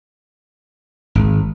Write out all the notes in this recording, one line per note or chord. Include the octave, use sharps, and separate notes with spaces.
G#1